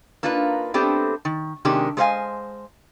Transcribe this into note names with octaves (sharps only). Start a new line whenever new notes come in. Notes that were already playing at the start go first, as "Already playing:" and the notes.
A#3 D4 D#4 F4 B4
A3 B3 C4 D4 G4 A4
D#3
C3 D#3 G#3 C#4 D4 G4
G#3 A3 C5 D#5 F5 G#5